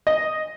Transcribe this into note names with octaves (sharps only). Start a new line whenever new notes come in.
D#5